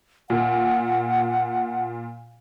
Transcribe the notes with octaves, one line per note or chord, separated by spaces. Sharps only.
A#2 F#5